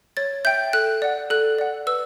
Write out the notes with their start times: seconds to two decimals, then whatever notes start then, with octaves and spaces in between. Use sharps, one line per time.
0.17 C#5 A6
0.45 E5 G5 G6
0.73 A4 F#6
1.02 D5 F#5
1.30 A4 F#6
1.58 D5 F#5
1.87 B4 E6